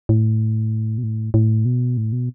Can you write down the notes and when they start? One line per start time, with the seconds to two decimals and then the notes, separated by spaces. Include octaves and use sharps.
0.09 A2
0.98 B2
1.03 A2
1.34 A2
1.65 B2
1.97 A2
2.13 B2